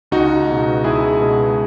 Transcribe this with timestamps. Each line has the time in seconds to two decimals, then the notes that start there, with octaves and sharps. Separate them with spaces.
0.11 C#2 D#4 F#4
0.47 B2 G#3
0.84 C#2 E4 G#4
1.21 B2 G#3